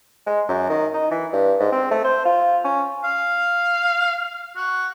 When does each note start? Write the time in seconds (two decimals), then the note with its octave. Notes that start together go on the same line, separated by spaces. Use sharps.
0.26 G#3
0.48 F#2
0.70 D#3
0.94 D#4
1.11 E3
1.32 G2
1.60 G#2
1.72 C4
1.91 A3
2.04 C5
2.25 F4
2.64 C#4
3.04 F5
4.56 F#4